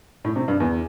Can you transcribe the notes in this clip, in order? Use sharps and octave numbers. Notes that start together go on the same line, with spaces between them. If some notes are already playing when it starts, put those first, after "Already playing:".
A2
C3
G2
E2